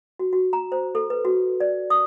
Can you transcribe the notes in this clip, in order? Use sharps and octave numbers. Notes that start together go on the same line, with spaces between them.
F#4
F#4
A#5
C5
A4
B4
F#4
D5
D#6